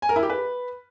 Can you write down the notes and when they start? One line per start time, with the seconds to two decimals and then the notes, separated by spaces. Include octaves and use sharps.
0.02 G#5
0.09 A#4
0.16 E4
0.23 G4
0.30 B4